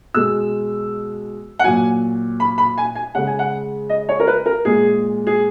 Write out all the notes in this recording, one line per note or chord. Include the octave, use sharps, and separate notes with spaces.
B2 G#3 E6
F#5
A#2 F#3 G#5
B5
B5
G#5
G#5
C#3 G#3 F#5
G#5
F#5
D#5
C#5
A#4
B4
A#4
A#2 G#3 G#4
G#4